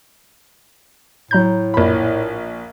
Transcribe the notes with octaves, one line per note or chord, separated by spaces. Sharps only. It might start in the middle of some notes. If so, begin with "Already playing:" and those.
A2 F#3 A#5 G6
A#1 B5